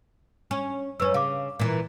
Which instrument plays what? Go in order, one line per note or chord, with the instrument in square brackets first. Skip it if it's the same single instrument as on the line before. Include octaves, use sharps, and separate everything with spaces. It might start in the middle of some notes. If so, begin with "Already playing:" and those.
[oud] C#4
[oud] F#2 C#4 [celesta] B4 E6
[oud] C#3 [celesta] F5 D6
[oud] A#2 E3